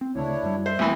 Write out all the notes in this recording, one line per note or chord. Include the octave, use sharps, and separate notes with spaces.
C4
D2 C#3 D4 E4 C#5
F#2 G3
C5 E5
E1 C2 E3 A3 A#3